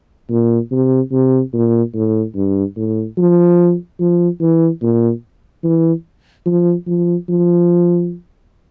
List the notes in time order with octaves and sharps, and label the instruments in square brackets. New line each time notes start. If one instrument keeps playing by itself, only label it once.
[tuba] A#2
C3
C3
A#2
A2
G2
A2
F3
F3
E3
A#2
E3
F3
F3
F3